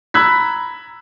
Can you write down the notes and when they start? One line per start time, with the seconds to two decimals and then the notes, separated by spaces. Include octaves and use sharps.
0.14 A#5 B5 E6 F#6 G#6 B6